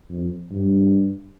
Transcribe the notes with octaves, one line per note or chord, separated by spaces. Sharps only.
F2
G2